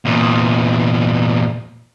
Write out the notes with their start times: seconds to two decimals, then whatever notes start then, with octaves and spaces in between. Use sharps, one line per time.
0.05 E2 A#2